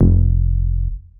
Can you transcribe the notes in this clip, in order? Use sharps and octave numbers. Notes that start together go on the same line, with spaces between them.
F1